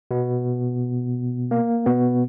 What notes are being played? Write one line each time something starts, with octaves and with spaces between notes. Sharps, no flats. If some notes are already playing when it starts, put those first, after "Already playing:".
B2 B3
A#3
B2 B3